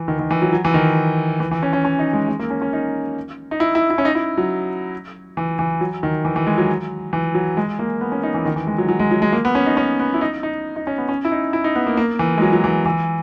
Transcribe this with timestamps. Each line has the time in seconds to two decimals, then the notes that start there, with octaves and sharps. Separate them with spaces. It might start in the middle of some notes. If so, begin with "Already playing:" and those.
Already playing: E3
0.08 D#3
0.19 D#3
0.31 E3
0.42 F#3
0.53 F#3
0.65 E3
0.74 D#3
1.40 E3
1.51 E3
1.63 C#4
1.73 C#4
1.85 C#4
1.99 D#4
2.13 G#3
2.28 G#3
2.40 A#3
2.50 C#4
2.62 C#4
2.73 D#4
3.51 D#4
3.60 E4
3.75 E4
3.90 E4
3.98 C#4
4.05 D#4
4.15 E4
4.38 F#3
5.37 E3
5.59 E3
5.81 F#3
6.03 D#3
6.25 E3
6.36 E3
6.47 G#3
6.58 F#3
7.13 E3
7.35 F#3
7.57 G#3
7.79 A#3
8.01 B3
8.12 C#4
8.23 D#4
8.34 E3
8.45 D#3
8.56 E3
8.67 G#3
8.78 F#3
8.88 F#3
8.99 G#3
9.11 F#3
9.22 G#3
9.33 A#3
9.45 B3
9.55 C#4
9.66 D#4
9.77 C#4
10.00 B3
10.14 E4
10.21 D#4
10.43 D#4
10.76 D#4
10.87 C#4
10.98 B3
11.09 C#4
11.25 E4
11.32 D#4
11.53 E4
11.64 D#4
11.75 B3
11.87 A#3
11.97 A#3
12.19 E3
12.38 G#3
12.42 F#3
12.53 F#3
12.64 E3
12.86 E3